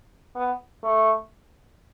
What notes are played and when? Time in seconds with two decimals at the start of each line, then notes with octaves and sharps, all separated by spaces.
0.36 B3
0.84 A3